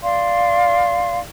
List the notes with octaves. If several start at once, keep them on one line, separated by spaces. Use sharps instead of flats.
D5 F5 C6